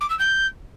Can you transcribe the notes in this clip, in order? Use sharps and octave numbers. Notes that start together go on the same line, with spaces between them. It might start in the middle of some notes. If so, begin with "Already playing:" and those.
D6
E6
G6